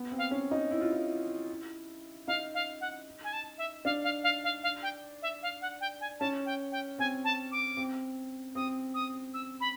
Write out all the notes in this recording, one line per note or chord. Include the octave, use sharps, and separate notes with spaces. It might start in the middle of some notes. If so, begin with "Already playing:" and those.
Already playing: B3
C4
F5
C#4
D#4
E4
F4
E4
D#4 F5
F5
F#5
G#5
A5
E5
D4 F5
F5
F5
F5
F5
G5
E5
F5
F#5
G5
G#5
C#4 A5
G5
G5
C4 G#5
A5
D6
C4
C4 D#6
D#6
E6
B5